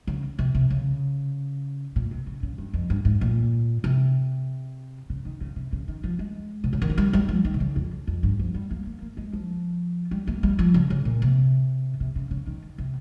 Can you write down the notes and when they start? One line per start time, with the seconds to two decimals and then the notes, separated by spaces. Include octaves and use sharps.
0.07 C#3
0.39 C3
0.54 C3
0.70 C#3
1.96 A#2
2.11 C3
2.27 C#3
2.43 C#3
2.58 G2
2.73 F2
2.90 G2
3.05 G#2
3.21 A#2
3.84 C3
5.10 C#3
5.25 D#3
5.41 C#3
5.56 C3
5.73 C#3
5.88 D#3
6.04 F3
6.19 G#3
6.64 C3
6.73 C#3
6.82 D#3
6.90 F3
6.98 G3
7.13 G3
7.29 F3
7.45 D#3
7.54 C3
7.60 C#3
7.76 F2
8.07 F2
8.23 G2
8.39 F3
8.54 G3
8.71 A#3
8.86 A#3
9.01 A#3
9.17 G#3
9.33 F3
10.11 G3
10.27 A#3
10.43 G3
10.59 F3
10.74 C#3
10.90 C#3
11.05 A#2
11.22 C3
12.00 C3
12.16 C#3
12.31 C#3
12.47 D#3
12.78 C3